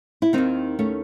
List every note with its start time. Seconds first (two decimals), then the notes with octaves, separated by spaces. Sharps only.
0.22 E4
0.33 D#2 D#3 C4 D#4
0.79 A3 C#4